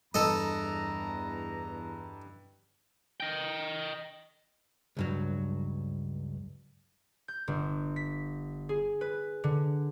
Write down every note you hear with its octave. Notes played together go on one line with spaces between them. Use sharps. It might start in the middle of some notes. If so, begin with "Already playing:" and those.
E2 G2 A4 D#5 A#5
D#5 G5
C#2 G2 F#3
G6
G1
B6
G#4
B4
D3